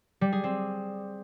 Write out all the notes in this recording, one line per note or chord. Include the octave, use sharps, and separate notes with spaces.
G3
G#4
C4